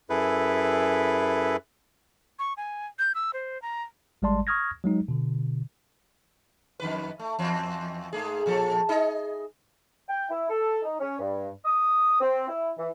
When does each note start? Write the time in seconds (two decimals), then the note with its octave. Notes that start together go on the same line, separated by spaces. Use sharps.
0.10 F#2 E4 G#4 A4 B4
2.39 C#6
2.57 G#5
2.99 G6
3.15 E6
3.33 C5
3.62 A#5
4.22 G#1 G3 G#3 D5 A5 C6
4.47 C#6 D#6 F6 G#6 A#6
4.84 F#3 G#3 D#4
5.08 B2 D3
6.80 F2 D#3 B4
7.19 A3
7.39 E2 C4
8.13 G#2 A3 G#4
8.46 A#2 F3 A4
8.89 D#4 G#4 D#5
10.09 G5
10.29 E4
10.50 A4
10.82 D#4
11.00 C#4
11.19 G2
11.65 D#6
12.20 C4
12.48 E4
12.77 E3